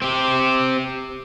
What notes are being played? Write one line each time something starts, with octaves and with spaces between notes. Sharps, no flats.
C4 G4